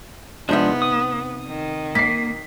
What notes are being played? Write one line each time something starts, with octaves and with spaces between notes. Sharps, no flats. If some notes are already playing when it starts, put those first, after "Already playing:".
C3 F3 G#3 B3 D4 D#4 E5
D#6
D#3
A#3 B6 C7